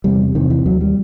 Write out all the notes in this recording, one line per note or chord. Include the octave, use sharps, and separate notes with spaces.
E2 C3 G3
E2 C3 D#3
E3
D#2 F#3
G3